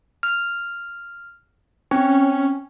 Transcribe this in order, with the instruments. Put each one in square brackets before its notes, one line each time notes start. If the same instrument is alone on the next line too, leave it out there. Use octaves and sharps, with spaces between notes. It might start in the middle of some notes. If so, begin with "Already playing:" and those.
[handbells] F6
[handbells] C4 [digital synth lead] C#4